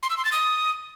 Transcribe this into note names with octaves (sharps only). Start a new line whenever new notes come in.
C6
E6
C6
A6
D#6